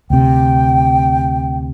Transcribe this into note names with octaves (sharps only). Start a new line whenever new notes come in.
D2 C3 G5